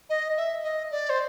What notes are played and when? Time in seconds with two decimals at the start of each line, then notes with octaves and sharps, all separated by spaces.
0.09 D#5
0.37 E5
0.63 D#5
0.91 D5
1.09 C5